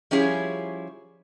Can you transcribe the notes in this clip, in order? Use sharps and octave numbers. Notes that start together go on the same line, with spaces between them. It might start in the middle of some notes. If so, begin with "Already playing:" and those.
F3 G3 C#4 E4 G#4 C#5